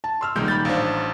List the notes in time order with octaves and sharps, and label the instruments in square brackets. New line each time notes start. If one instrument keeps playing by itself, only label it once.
[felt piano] A5
C6 E6 F6
[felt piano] D#1 D#4 [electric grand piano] C2 G#3 G6
[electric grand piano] B5 G6 A6
[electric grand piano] A1 D4 [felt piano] C5 F5
[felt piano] C5